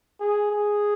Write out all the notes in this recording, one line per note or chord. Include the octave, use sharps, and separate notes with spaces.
G#4
G#4